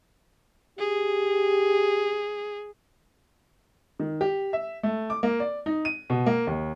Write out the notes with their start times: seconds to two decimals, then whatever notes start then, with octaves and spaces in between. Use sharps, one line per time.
0.79 G4 G#4
4.00 D#3
4.21 G4
4.53 E5
4.83 A3
5.10 D6
5.23 A#3
5.40 D5
5.66 D#4
5.85 D#7
6.10 B2
6.26 A#3
6.47 D#2